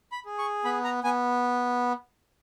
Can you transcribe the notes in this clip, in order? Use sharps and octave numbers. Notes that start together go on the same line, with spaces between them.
B5
G#4
C#6
B3 B5
A#5
B3 G#5